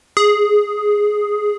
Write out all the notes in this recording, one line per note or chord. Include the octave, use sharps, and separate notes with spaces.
G#4